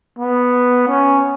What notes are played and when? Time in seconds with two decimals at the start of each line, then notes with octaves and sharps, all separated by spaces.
0.19 B3
0.88 C#4